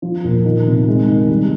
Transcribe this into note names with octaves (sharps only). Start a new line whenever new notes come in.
F3
A#2
D#3
C3
G#3
D#3
G3